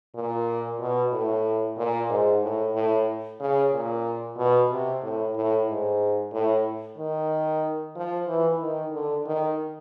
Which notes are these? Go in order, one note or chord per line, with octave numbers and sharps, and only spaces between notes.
A#2
B2
A2
A#2
G#2
A2
A2
C#3
A#2
B2
C3
A2
A2
G#2
A2
D#3
F3
E3
D#3
D3
D#3